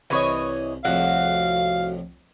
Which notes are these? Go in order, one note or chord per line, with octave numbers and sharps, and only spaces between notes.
C2 E3 C#5 D#5
C2 F2 A2 F#4 F5